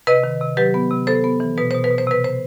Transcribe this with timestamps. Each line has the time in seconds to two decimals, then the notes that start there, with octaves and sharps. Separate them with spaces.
0.07 C3 B4 D#5
0.24 D#3
0.41 C3
0.57 F#3 G4 B4
0.74 B3
0.91 C3
1.07 B3 A4 C5
1.24 B3
1.40 E3
1.57 B2 B4
1.71 B2 C5
1.84 B4
1.91 B2
1.98 C5
2.07 C3 B4
2.24 C5